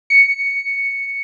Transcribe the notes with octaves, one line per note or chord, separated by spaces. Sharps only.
C#7